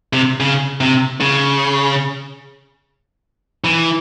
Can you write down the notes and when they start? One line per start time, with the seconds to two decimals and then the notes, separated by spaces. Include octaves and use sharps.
0.13 C3
0.40 C#3
0.81 C3
1.21 C#3
3.64 E3